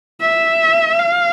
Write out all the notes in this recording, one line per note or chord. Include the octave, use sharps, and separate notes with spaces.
E5
F5